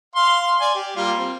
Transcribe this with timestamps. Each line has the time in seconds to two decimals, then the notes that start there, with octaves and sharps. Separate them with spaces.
0.16 F5 C6
0.61 D5 G#5
0.75 G4
0.96 G3 A#3 F4
1.18 C4